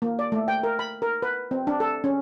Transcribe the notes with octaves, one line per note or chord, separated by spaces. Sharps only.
A#3
D5
A3
G5
A#4
B5
A#4
B4
C4
D4
A4
C#4